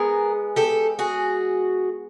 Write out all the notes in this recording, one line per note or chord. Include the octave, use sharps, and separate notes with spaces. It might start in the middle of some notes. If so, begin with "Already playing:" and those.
Already playing: G#3 B3 G#4 A#4
G4 A4
F#4 G#4